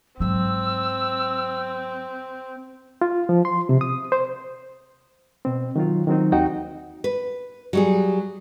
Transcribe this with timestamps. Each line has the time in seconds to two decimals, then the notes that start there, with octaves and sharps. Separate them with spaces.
0.20 G#2 F#3 C4 E6
3.01 F4
3.29 F3
3.45 C6
3.69 C3
3.81 D#6
4.12 C5
5.45 B2 C4
5.76 D#3 F#3 F4
6.07 D#3 F#3 C4 D#4
6.32 D#2 D#4 F#4 F#5 G5
7.04 B4
7.73 F#3 G3 G#4